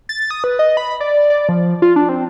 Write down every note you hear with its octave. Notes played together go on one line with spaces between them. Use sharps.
A6
D#6
B4
D#5
B5
D5
D5
F3
F4
D4
C4